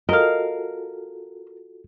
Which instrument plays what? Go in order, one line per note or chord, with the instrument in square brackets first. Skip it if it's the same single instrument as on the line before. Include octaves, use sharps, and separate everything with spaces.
[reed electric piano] F4 F#4 A4 [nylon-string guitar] A#4 [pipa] D#5 F5